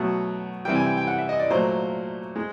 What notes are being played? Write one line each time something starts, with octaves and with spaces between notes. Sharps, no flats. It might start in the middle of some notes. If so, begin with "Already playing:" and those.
Already playing: B2 F#3 A3 F#5
C3 E3 G3 G5
G#5
G5
G5
F#5
E5
D#5
D5
A#2 F#3 A3 C5
G#3